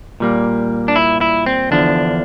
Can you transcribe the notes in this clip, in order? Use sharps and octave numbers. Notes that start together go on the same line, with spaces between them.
A#2 G3 A#3
D4
E4
E4
C4
E2 D3 F3 D4